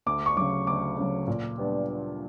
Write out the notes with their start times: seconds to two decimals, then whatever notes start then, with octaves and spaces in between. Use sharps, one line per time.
0.06 D2 D6
0.26 C#6
0.37 C#3 F#3 D6
0.67 D2 D6
0.97 C#3 F#3
1.28 A#2
1.58 G3 B3 D4